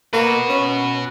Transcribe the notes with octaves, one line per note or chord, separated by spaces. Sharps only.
A#3 F#4 B4
C#4